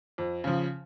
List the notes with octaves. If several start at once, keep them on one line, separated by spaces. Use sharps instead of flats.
F2
C#3 F3